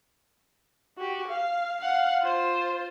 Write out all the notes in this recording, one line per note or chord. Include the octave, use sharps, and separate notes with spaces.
F#4 G4
F5
F5 F#5
F4 C5